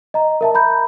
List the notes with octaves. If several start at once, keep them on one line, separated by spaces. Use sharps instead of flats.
D#5 A#5
A#4 E5 A5
A#5 B5 G6